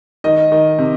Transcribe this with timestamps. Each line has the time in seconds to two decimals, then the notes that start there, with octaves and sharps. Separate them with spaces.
0.24 D#3 D#5
0.52 D#3
0.78 C3